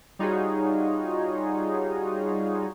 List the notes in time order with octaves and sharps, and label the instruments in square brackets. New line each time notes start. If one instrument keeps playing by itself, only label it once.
[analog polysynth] G3 D#4 F4 F#4 G#4 C#5